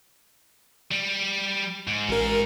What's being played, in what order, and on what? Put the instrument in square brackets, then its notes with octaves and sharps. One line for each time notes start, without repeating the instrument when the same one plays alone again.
[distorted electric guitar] G3
G#2
[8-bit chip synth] A1 A#4